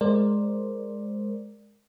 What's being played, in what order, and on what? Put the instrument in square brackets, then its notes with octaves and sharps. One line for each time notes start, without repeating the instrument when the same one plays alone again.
[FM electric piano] G#3 A#4 C5 D5